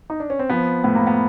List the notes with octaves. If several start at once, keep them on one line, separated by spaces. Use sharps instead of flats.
D#4
D4
C#4
C4
F3 B3
A2 B3
A#3
B3